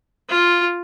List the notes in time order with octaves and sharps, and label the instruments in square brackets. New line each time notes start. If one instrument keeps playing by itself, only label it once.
[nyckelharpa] F4